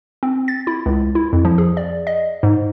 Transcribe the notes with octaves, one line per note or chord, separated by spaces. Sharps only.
C4
A6
E4
C#2
E4
F2
F3
G#4
D5
D#5
G#2